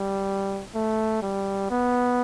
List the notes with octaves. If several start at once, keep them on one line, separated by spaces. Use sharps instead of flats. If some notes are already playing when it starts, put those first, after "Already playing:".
Already playing: G3
A3
G3
B3